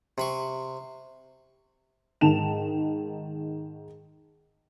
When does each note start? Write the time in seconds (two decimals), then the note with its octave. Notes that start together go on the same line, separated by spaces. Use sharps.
0.18 C3 B5 C#6
2.21 G#2 D#3 A5 E7 F7